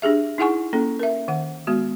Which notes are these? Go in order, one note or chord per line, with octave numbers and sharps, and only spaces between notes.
D4 G4 G#4 E5
D#4 E4 G#4 F#5 G#5 C#6
A#3 C#4 A4
A#4 E5
D#3 F#5
G#3 B3 F#4